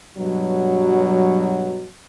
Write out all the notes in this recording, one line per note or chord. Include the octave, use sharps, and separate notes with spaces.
G2 B2 F#3